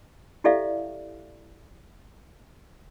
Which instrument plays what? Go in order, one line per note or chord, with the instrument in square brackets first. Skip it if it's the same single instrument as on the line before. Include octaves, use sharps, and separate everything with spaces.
[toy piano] E4 G4 A4 D5 E5 F5